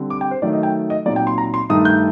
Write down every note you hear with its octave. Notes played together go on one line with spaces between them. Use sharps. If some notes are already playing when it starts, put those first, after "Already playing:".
Already playing: D3 G3 C4
D6
G5
C5
D#3 F#3 A3 D5
D#5
G5
D#5
A#2 F#3 C4 D#4 D5
G5
C6
A#5
C6
G2 D#3 A3 D#4 D#6
G6